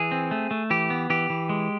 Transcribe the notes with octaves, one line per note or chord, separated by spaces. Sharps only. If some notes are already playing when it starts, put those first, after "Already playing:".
Already playing: E3 G#4
C4
A3
A3
E3 G4
B3
E3 G4
E3
G#3